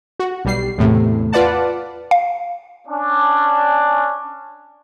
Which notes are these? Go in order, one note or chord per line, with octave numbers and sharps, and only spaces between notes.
F#4
B1 G3 C7
E2 A2 C3
F4 B4 D5 F#5 A5
F5
C#4 D4